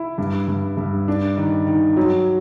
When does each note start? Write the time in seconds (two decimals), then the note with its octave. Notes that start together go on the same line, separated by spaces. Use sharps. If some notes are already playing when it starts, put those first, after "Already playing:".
Already playing: E4
0.18 G2
0.48 G2
0.77 G2
1.08 D4
1.37 D#3
1.67 D#3
1.97 F#3